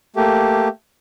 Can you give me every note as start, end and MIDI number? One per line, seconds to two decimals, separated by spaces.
0.16 0.68 57
0.16 0.68 58
0.16 0.68 67